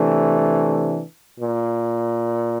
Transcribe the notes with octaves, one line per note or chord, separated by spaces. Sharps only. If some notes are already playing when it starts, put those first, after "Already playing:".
Already playing: C3 E3 A3 D4
A#2